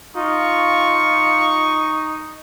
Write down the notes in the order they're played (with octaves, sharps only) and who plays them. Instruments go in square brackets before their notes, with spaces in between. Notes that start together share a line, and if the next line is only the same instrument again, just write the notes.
[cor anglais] D#4 [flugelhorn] F4 [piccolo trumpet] C#6